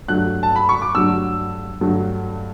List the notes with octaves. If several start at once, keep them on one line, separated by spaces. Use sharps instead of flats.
G2 D3 F#3 A3 F#6
A5
B5
C#6
D6
G2 D3 F#3 A3 E6
G2 D3 F#3 A3